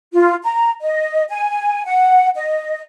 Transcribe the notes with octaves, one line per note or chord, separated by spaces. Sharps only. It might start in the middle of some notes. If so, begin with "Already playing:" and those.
F4
A#5
D#5
G#5
F#5
D#5